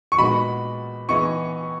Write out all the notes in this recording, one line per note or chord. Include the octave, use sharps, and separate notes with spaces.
C#6
A#2 G#3 B3 D#4 F#4 B5
E3 B3 D#4 G#4 C#6